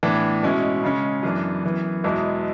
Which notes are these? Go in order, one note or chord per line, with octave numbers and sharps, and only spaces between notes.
A2 E3 B3 D4
B2 G#3 C#4 E4
C#3 G#3 C#4
F#2 E3 B3 D4
F#2 E3 B3
E2 B2 G#3 B3 E4